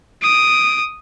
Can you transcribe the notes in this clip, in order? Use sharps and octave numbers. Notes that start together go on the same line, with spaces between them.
D#6 D7